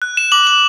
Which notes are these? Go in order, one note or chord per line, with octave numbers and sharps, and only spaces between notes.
F#6
E7
D6 F#7
F#7